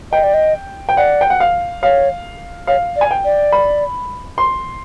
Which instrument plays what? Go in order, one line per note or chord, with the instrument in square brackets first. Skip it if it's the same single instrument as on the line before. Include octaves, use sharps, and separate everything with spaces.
[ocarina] D#5 [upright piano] G5
[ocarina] D5
D#5
[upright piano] G5
[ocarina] D5 [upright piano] F#5
[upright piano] G5
F#5
F5
[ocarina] C#5 [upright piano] F5
[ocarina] C#5 [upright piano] F5
[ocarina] D5
[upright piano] G#5
G5
[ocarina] D5
[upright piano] B5
C6